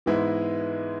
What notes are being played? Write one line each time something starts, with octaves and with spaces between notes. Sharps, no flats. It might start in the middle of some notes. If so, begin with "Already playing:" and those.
G#2 E3 G#3 B3 E4